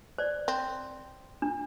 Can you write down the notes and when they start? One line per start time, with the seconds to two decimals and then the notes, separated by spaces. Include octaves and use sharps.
0.18 C5 D5
0.48 C4
1.42 D4